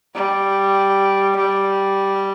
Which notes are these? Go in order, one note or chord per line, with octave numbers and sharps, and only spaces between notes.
G3
G3